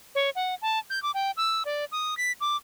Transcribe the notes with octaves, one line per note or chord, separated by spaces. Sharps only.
C#5
F#5
A5
G6
D6
G5
E6
D5
D#6
B6
D6